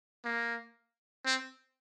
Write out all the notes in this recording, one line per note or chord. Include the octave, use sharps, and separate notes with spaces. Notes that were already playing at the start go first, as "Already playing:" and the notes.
A#3
C4